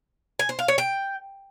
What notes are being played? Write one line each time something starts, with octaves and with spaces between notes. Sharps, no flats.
G#5
C5
F5
C#5
G5